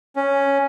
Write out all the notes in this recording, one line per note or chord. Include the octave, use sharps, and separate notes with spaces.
C#4